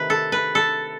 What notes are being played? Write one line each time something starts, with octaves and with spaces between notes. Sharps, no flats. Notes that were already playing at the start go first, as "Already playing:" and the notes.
Already playing: C3 D#3 A3 C4 B4
A4
B4
A4